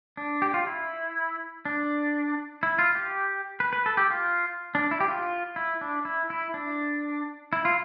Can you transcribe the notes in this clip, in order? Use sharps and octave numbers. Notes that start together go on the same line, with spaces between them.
D4
G4
F4
E4
D4
E4
F4
G4
B4
B4
A4
G4
F4
D4
E4
G4
F4
E4
D4
E4
E4
D4
E4
F4